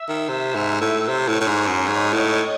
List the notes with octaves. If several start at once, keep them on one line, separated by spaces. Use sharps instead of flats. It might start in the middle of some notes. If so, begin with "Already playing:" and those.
Already playing: E5 E6
D#3
C3 E5 E6
G#2
A2
C3 C#5 C#6
A2
A2
G#2
F#2
G#2 D#5 D#6
A2